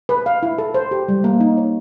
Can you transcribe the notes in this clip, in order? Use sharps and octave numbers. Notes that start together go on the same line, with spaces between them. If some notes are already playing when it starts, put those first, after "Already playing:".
B4
F5
E4
A4
C5
G4
G3
A#3
D#4
C#5